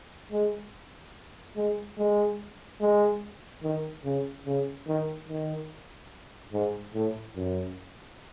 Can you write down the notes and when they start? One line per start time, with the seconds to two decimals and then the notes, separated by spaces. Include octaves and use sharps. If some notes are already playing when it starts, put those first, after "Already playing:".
0.32 G#3
1.56 G#3
1.98 G#3
2.81 G#3
3.63 D#3
4.05 C#3
4.46 C#3
4.87 D#3
5.29 D#3
6.53 G#2
6.94 A2
7.36 F#2